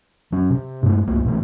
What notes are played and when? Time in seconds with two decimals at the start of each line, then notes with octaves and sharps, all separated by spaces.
0.32 F#3 C#4
0.50 C3
0.83 G2 G#3 A3
1.07 C2 F#3 A3 A#3
1.24 A2 C3 E3 A3